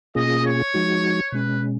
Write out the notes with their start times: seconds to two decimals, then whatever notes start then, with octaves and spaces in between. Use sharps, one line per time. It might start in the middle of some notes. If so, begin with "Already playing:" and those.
0.15 B2 A#3 C#4 F4 G#4 D#5
0.45 C#5
0.74 F3 G#3 D#4 F#4
1.31 B2 G#3 C#4 B4